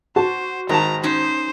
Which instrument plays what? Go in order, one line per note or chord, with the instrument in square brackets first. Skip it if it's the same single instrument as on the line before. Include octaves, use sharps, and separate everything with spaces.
[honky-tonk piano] F#4 [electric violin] C5 [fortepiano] A5
[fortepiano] G#1 A5 [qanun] A#4 [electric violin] A#5
[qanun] C#4 D#4 [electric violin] C5